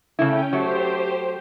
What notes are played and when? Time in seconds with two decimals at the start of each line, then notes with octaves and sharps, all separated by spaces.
0.19 C#3 A3 C#4 E4 G5
0.53 F#3 A3 G4 C5